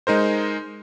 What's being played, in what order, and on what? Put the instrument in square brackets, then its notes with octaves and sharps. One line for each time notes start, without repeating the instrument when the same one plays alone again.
[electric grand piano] G#3 D#4 A#4 C5